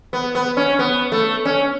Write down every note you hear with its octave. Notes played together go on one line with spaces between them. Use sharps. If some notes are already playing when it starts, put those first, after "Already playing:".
B3
B3
C#4
B3
A3
C#4